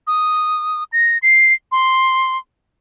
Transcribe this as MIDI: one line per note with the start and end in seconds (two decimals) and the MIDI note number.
0.07 0.84 87
0.92 1.18 94
1.22 1.53 96
1.72 2.38 84